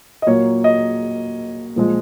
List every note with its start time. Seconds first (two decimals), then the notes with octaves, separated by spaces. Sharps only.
0.22 D#5
0.27 A#2 F#3 A#3 C#5
0.64 D#5
1.76 A#2 F3 G#3